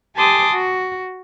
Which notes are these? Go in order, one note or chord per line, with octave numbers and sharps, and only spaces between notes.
G4 G#5 A5 C6 D6 D#6
F#4